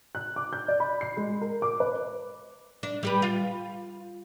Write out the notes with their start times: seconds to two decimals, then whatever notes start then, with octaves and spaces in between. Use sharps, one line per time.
0.15 F#6
0.36 D6
0.53 G6
0.68 D5
0.80 B5
1.01 C7
1.17 G#3
1.41 A#4
1.62 D6
1.80 B4
2.83 D4
3.03 G3 G4 B4
3.22 F4